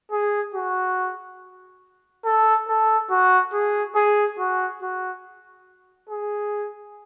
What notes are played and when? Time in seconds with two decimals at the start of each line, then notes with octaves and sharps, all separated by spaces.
0.12 G#4
0.54 F#4
2.25 A4
2.68 A4
3.10 F#4
3.53 G#4
3.95 G#4
4.38 F#4
4.82 F#4
6.09 G#4